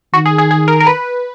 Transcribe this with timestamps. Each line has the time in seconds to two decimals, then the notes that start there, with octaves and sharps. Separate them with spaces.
0.14 D#3 F#4
0.26 G#4
0.38 G#4
0.51 G#4
0.68 A#4
0.80 A#4
0.87 B4